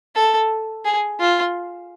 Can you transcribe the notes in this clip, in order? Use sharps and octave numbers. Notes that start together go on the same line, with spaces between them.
A4
G#4
F4